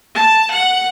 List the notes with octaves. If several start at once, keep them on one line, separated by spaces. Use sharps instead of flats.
A5
F#5